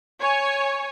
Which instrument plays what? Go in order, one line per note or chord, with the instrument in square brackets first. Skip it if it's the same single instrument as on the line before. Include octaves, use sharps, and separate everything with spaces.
[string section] C#5 G#5